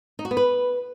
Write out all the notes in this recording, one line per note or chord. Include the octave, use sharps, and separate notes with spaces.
D#4
F#4
B3
B4